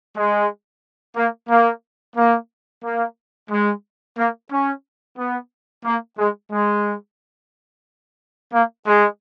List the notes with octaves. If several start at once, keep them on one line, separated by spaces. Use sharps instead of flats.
G#3
A#3
A#3
A#3
A#3
G#3
A#3
C#4
B3
A#3
G#3
G#3
A#3
G#3